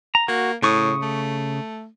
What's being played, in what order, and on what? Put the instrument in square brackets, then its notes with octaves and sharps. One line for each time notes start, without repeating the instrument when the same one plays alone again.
[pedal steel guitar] A#5
[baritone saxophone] A#3 [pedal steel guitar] F#4
[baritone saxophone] A2 [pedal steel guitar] C#3 C#6 D#6
[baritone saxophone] A3